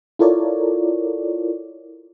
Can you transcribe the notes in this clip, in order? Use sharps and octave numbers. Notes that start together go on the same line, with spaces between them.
E4 F4 A4 A#4 C#5 D5